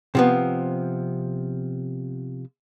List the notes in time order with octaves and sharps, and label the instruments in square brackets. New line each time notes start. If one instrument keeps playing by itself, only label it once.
[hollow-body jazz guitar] C3 F3 B3